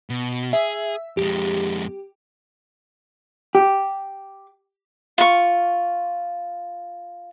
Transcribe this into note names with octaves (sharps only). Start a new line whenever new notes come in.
B2
G#4 E5
F2 G#3 G4
G4
F4 C#6